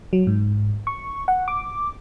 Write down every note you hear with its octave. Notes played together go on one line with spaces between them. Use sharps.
F#3
G#2
C#6
F#5
D6